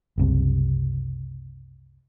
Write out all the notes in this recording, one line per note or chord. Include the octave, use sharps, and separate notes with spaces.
F#1 C2 C3